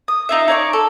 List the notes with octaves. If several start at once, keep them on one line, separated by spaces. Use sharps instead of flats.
D#6
D#4 F4 E5
D#4 C#5 D5 C#6
A4